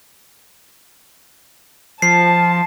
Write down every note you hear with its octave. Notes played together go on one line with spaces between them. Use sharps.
F3 A5 C7